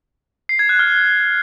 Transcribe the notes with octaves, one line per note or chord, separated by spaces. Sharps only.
C7
G#6
F#6
F6